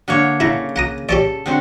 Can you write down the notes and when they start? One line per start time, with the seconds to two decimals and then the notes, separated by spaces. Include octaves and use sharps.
0.08 D3 A#3 C#5
0.40 C#3 E4 A#5
0.76 F#5 A#5 D#6
1.09 G4 A4 C#5 D5
1.46 D3 C4 F#4